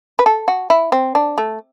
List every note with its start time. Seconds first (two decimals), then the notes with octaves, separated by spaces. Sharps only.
0.19 B4
0.26 A4
0.48 F#4
0.70 E4
0.92 C4
1.15 D4
1.38 A3